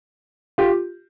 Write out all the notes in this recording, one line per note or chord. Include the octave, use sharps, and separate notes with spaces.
F4 G4